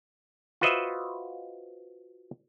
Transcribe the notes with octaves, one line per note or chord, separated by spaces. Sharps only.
F4 F#4 B4 C5 D#5 E5